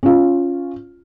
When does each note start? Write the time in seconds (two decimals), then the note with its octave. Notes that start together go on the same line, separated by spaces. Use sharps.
0.03 C#4 F4